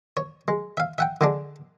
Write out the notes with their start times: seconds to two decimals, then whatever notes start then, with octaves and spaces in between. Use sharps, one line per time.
0.17 C#5
0.48 G#3
0.77 E5 F5
0.98 E5 F#5 G5
1.21 D3 G#3 D4